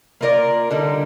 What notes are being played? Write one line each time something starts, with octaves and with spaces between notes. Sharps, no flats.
A#3 F4 A#4 D5
D3 G3 A#3 D#4